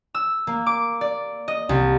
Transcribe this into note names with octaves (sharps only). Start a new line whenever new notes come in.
E6
A#3
D6
D5
D#5
C2